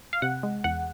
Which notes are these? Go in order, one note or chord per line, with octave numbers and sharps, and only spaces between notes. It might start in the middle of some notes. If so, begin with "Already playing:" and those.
F5
C3 F#5
G#3
E2 F#5